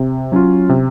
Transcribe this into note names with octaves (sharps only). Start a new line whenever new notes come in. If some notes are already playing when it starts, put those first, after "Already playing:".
Already playing: C3
F#3 C#4 F4
C3